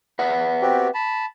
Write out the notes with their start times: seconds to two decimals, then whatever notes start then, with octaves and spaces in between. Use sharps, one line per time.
0.19 B4 E5 F#5
0.62 C4 F#4 G4
0.94 A5 B5